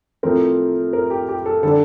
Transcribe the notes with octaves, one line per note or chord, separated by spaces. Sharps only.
A2 F3 A3 C4 A#4
A#4
G4
G4
A4
D3 G3 D4 A4